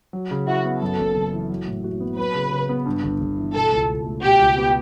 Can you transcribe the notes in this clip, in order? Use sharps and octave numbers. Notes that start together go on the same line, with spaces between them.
F#3
C#3
E4 F#4
B3
F#2 A4
F#1
F#1
E3
F#3
A2
F#4
B3
F#3 B4
C#3
C#3
B3
G2
G1
G1
E3
B2 A4
C#2
C#2
A3
B2 G4
C#2
B3